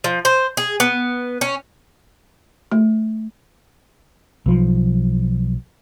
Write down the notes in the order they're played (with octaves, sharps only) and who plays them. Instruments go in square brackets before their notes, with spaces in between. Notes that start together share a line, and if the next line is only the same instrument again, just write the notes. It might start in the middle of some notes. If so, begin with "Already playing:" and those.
[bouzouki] F3
C5
G#4
B3
C#4
[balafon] A3
[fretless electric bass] B1 F3